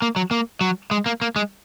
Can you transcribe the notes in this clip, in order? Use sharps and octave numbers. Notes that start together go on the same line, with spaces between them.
A#3
F#3
A#3
F#3
G#3
A#3
A#3
G#3